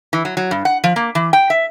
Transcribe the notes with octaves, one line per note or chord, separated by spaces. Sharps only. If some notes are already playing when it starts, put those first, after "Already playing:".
E3
F#3
F#3
G2
F#5
F3
A#3
E3
G5
E5